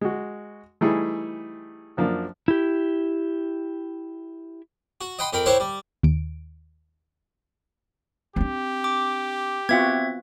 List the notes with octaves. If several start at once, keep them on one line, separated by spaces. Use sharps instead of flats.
G#3 F#4
E3 G3 A3 D#4 E4 G#4
F#2 F3 A#3 D4
E4 G4
F#4
D#5 F#5 G5 B5 C6
F2 A#4 G5 B5
E4 G4 C5 C#5 F#5 C#6
G3
D#2 D7
C4 D4 G4
D6
B3 C4 F4 F#4 E5 G#6